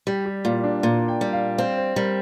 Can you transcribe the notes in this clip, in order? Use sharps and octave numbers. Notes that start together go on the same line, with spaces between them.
G3 G4
G4
A#2 F4
D4
A#2 F4
G5
G3
F5
C4 F5
C5
G3 A#4